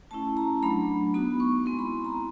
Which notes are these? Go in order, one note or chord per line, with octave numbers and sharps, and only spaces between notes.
A3 C#4 E4 A5
A#5
F#3 A3 D4 B5
B3 D#4 F#4 B5
C#6
G#3 C4 E4 C6
B5
A#5